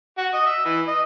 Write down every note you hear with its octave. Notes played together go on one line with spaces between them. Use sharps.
F#4
D#5
E5
E3
D#5